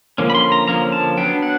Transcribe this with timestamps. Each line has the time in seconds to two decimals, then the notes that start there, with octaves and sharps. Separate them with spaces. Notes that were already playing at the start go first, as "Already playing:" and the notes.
0.18 D3 F3 A#3 C#4
0.30 B5
0.35 C6
0.52 A#5
0.68 D3 F3 A#3 C#4 A#5
0.92 A5
1.18 F#3 B3 D4 G5
1.42 F#5